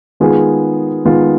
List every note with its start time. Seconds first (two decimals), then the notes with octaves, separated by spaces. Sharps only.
0.20 D#3 G#3 B3 F4 G#4
1.05 D#3 G#3 B3 F4